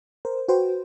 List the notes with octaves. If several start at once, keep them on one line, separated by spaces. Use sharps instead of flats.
A#4 C5
F#4 B4 C5 G5